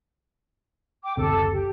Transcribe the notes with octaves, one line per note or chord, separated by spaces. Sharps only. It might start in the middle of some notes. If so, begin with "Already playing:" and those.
G5 D6
F#1 D2 C3 A4 D6
G4